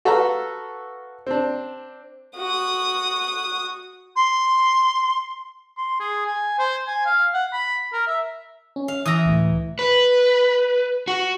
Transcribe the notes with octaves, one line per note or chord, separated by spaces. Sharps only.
F#4 A4 B4 F5 A#5
C4 D4
F#4 D#6
C6
C6
G#4
G#5
C5
G#5
F5
F#5
B5
A#4
E5
C#4
F5
E3 A#5 D#6 A#6
C#2 A2
B4
F#4